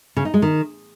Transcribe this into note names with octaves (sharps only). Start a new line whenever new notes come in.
C#3
D#4
G#3
D#3